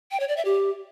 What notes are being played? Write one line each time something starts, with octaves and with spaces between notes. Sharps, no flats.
G5
C#5
D5
E5
G4